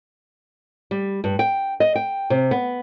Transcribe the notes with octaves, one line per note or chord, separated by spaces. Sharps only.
G3
G2
G5
D#5
G5
C3
B3